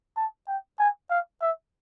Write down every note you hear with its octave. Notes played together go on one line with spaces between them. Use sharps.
A5
G5
G#5
F5
E5